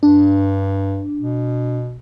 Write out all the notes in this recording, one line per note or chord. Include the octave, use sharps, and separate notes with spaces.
G2 D4
B2